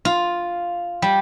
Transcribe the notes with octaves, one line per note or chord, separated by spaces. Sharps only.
F4
G3